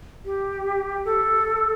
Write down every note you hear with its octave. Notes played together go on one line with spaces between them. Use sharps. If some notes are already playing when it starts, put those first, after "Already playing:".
G4
A4